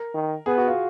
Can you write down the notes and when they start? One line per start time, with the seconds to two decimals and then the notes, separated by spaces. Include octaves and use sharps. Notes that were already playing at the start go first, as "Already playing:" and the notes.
Already playing: A#4
0.14 D#3
0.46 B3 G#4
0.58 F#4
0.68 F4